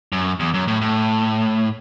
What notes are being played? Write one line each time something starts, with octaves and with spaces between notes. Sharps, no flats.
F#2
E2
F#2
A2
A2